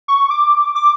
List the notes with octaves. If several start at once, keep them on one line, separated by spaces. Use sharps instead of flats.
C#6
D6
D6